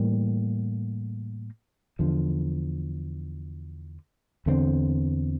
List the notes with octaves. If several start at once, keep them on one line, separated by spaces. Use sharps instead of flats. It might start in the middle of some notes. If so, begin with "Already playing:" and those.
Already playing: A2 E3 G3 A#3
E2 D3 F3
E2 D3 A3 C4